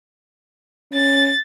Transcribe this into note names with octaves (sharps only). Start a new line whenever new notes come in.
C#4 A6